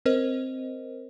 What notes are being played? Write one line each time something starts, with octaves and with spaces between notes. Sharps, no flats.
C4 A#4 C5 D#5